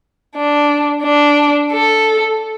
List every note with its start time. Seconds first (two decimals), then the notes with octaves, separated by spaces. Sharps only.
0.36 D4
1.03 D4
1.72 A4